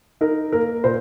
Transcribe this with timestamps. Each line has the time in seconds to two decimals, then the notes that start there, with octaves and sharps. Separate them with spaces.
0.21 D#4 A#4
0.52 A#3 A#4
0.84 A#2 C5